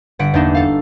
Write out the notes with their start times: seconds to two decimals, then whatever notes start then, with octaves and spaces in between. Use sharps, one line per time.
0.19 G1 F#5 B6 D7
0.34 E2 A#3 D4 D#4 E7
0.54 A4 F5